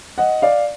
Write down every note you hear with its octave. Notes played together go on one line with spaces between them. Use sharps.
D#5 F#5
D5 F5